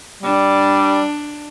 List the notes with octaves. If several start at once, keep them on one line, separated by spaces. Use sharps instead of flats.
G3 D4